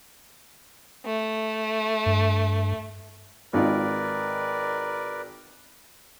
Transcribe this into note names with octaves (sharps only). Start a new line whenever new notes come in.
A3
G2
G#1 D#4 F4 A#4 B4 D5